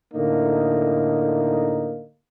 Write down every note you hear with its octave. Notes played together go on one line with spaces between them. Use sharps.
A2 D3 A#3 D#4